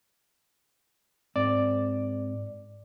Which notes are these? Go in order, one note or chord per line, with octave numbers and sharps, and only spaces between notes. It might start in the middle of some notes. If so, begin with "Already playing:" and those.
G#2 C4 D5